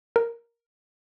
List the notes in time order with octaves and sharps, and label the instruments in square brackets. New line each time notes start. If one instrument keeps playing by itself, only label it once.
[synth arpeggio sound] A#4